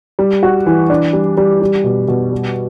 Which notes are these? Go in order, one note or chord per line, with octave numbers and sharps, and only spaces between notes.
G3
F#4
E3
D4
G3
G3
G3
B2
B2
G3